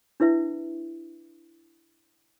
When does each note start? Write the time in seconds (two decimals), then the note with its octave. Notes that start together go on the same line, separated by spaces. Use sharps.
0.20 D4 E4 B4 E5